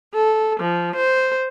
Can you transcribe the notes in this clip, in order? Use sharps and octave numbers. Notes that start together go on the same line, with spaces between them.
A4
F3
C5